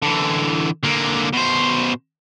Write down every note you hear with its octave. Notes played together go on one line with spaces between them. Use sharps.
D3 E3
D3 A#3
B2 C5